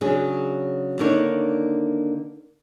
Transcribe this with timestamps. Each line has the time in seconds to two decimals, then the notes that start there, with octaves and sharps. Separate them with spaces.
0.01 C#3 F#3 D4 G#4
0.99 D3 D#3 A#3 D4 D#4 C#5